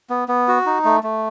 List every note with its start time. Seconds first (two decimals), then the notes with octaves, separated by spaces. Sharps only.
0.10 B3
0.28 B3
0.48 F#4
0.66 D#4
0.85 A3
1.03 A3